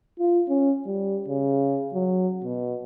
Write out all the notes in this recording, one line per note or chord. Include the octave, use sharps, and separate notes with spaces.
F4
C#4
G3
C#3
F#3
B2